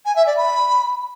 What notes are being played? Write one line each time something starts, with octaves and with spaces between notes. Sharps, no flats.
G#5
E5
D5
B5